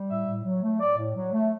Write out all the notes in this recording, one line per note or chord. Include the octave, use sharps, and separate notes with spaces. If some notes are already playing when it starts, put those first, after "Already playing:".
Already playing: G3
A2 E5
A2
F#3
A3
A2 D5
A2
F#3
A3